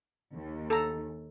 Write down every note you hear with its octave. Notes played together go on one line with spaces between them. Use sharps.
D#2
A4 A#5